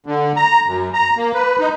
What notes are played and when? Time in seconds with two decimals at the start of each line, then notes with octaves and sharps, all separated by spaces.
0.06 D3
0.36 A#5
0.67 F#2
0.94 A#5
1.17 A#3
1.34 B4
1.60 D#4